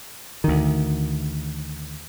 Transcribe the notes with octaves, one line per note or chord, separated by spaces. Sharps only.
D2 D#3